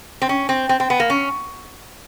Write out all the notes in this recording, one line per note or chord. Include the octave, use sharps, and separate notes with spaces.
C4
C#4
C4
C4
C4
B3
A#3
C#4